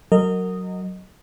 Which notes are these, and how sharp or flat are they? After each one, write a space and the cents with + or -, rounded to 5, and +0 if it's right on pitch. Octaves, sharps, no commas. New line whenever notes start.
F#3 +0 A#4 -25 D#5 +0